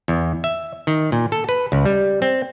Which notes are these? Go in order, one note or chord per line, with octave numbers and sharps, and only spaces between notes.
E2
E5
D#3
A#2
A4
B4
C#2
G3
C4